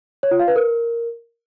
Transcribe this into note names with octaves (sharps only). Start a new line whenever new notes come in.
C#5
F4
F5
B4
A#4